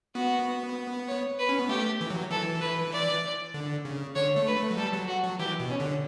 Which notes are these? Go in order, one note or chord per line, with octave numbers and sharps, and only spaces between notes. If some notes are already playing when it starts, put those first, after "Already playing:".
B3 F#4
C#5
B4
C#4
B3
A3 G4
E3
F#3
E3 A4
B4
D5
D3
C#3
D3 C#5
A3
B4
A3
F#3
G3 A4
F#3
F#4
F#3
E3 G4
B2
C#4
D3